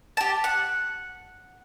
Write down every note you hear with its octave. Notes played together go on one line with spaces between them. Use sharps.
G4 A5
F#5